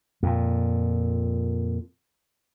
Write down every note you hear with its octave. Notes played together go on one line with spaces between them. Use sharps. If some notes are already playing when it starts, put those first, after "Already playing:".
F2 A#2